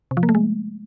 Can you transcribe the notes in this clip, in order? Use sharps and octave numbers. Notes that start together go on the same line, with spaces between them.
C3
F3
A#3
A3
G#3